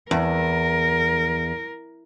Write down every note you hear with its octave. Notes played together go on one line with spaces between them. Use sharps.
E2 A#4